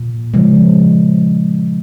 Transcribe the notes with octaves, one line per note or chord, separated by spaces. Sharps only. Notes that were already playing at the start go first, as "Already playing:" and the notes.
Already playing: A#2
C#3 F3 G#3